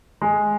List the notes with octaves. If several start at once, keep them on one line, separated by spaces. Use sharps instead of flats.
G#3